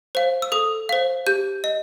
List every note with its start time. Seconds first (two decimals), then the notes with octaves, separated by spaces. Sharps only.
0.15 C5 F5
0.42 E6
0.52 A4 D#6
0.89 C5 F5
1.27 G4 G6
1.64 D#5